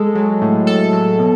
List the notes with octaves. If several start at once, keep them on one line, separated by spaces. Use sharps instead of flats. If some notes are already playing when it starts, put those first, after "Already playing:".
Already playing: G#3 A4
F#3
A2
A2 A4
F#3
B2